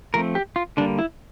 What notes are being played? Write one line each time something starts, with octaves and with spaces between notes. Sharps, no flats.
F3 A3 C4 A#4
G4
F4
D3 G3 A#3 D4
E4